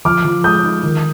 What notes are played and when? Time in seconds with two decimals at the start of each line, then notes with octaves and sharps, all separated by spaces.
0.05 F3 D6 F6
0.25 F3
0.44 G#3 D#6 G6
0.63 D#4
0.83 D#3